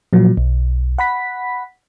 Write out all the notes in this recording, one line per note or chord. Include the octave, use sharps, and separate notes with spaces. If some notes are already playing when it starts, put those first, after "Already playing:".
A#2 F3 F#3
B1
F#5 B5 B6